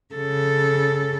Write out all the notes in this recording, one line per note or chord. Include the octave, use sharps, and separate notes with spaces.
C#3 A4